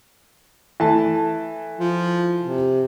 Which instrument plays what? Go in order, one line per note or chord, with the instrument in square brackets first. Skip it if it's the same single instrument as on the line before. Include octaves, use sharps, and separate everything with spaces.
[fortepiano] E3 A3 A5
[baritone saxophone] F3
C3